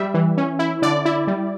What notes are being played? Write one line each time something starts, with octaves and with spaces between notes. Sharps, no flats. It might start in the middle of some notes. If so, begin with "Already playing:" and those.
Already playing: G3 E5
E3
C#4
E4
D3 D5
E4
G3